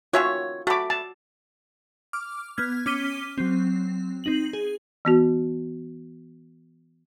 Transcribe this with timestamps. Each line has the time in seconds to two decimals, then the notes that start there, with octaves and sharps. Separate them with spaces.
0.13 D#3 C#4 F4 F#4 C#5 E5
0.67 A3 F#4 B5 D6
0.90 A5
2.13 D6 F6
2.58 B3 F6 G#6
2.86 C#4 D6 F6 B6 D#7 G7
3.38 F#3 C4
4.24 C4 D#4 F#7
4.53 G#4
5.05 E3 B3 F#4